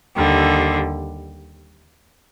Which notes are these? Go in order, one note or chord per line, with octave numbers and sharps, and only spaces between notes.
D#2 D3 G3